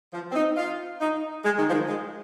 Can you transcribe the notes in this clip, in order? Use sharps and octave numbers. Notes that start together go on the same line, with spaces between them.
F3
C4
D#4
F4
D#4
G#3
D#3
F3
D#3
G#3